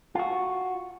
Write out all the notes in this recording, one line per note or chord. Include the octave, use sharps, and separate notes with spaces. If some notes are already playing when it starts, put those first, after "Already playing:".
F4 F#4